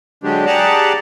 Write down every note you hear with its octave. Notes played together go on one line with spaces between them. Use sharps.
D3 F#3 G#3 D4 G4
G4 G#4 D5 F#5 A5 A#5